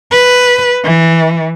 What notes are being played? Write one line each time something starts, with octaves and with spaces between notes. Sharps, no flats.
B4
E3